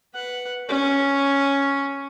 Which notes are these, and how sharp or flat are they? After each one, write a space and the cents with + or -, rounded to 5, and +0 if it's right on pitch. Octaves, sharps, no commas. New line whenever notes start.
B4 +0 F#5 +0
C#4 +0 C#5 +0